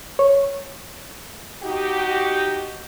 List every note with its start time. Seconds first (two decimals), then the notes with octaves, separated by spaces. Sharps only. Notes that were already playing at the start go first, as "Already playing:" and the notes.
0.19 C#5
1.63 D#4 F#4 G4